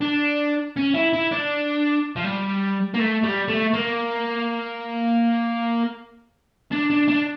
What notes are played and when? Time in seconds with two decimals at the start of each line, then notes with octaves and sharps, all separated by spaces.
0.01 D4
0.76 C#4
0.94 E4
1.13 E4
1.32 D4
2.16 F3
2.24 G3
2.94 A#3
2.99 A3
3.23 G3
3.48 A3
3.74 A#3
6.72 D4
6.90 D4
7.08 D4